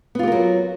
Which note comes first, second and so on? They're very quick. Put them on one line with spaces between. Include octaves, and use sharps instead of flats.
B3 F4 G4 A#4 F#3